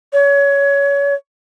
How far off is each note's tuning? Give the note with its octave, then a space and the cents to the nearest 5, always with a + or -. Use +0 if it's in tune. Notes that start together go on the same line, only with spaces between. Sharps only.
C#5 +25